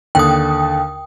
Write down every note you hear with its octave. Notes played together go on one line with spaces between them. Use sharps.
D#2 D3 G5 D#6